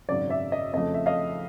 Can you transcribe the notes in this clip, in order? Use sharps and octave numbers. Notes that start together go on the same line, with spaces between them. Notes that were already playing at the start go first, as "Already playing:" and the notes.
G#1 F#2 C#3 F#3 D5
D5 E5
D#5
F2 C#3 F3 A3 D#5
E5
D#5 F5